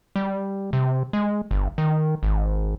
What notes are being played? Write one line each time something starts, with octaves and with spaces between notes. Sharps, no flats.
G3
C3
G#3
G1
D#3
G#1